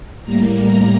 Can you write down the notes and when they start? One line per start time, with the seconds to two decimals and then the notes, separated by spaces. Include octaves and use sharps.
0.24 A2 G3 A#3 A#5
0.58 A#5